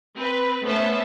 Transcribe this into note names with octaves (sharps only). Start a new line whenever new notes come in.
C4 B4
A3 B3 C#4 C5 E5 A5